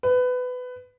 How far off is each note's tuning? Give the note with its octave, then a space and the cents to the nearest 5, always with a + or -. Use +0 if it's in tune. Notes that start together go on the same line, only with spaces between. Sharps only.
B4 +20